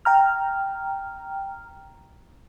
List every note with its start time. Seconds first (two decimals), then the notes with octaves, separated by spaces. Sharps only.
0.05 G5 A#5 F6